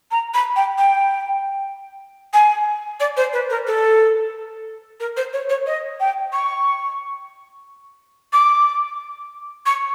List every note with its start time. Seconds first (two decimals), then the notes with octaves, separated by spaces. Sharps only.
0.11 A#5
0.34 B5
0.56 G5
0.78 G5
2.33 G#5
3.00 D5
3.17 C5
3.33 B4
3.50 A#4
3.67 A4
5.00 A#4
5.16 C5
5.33 C#5
5.49 C#5
5.66 D#5
6.00 G5
6.32 C#6
8.33 D6
9.66 C#6